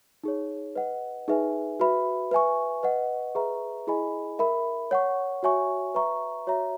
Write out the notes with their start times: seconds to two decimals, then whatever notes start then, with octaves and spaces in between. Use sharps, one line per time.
0.23 D#4 G#4 C#5
0.75 B4 D#5 F#5
1.28 D#4 G#4 B4 E5 G#5
1.80 F#4 B4 E5 B5
2.31 B4 E5 G#5 C#6
2.83 B4 D#5 F#5
3.35 G#4 B4 E5 A#5 C#6
3.87 E4 G#4 D#5 G#5 B5
4.39 A#4 E5 B5
4.91 C#5 F#5 C#6
5.43 F#4 C#5 E5 G#5 C#6
5.94 B4 E5 A#5 C#6
6.47 F#4 C#5 E5 A#5